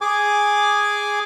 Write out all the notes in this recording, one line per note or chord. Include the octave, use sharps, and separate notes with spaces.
G#4 G#5 D6